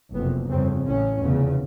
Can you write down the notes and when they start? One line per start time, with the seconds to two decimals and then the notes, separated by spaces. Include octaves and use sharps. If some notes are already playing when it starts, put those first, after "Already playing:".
0.14 F#1 F2 C3 B3
0.51 G1 F2 C#3 C4
0.87 A1 A2 C#4
1.24 F1 E2 C#3